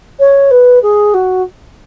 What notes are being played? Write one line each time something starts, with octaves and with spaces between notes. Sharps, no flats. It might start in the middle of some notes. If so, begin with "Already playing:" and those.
C#5
B4
G#4
F#4